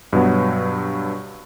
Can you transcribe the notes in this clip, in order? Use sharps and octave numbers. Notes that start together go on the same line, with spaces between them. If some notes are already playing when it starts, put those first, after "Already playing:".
G2 B2 F#3 B3